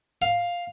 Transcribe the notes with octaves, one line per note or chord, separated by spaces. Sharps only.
F5